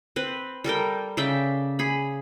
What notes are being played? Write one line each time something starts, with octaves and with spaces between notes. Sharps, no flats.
C4 B4
G3 A4 A#4 G5
C#3 D5 E5 G5
G#4 B5